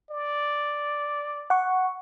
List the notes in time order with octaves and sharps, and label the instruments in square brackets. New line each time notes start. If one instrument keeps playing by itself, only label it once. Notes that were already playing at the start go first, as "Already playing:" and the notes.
[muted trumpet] D5
[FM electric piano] F#5 C#6